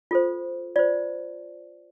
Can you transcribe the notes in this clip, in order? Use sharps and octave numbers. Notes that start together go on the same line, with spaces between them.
F4 A4 C5
F4 C5 D5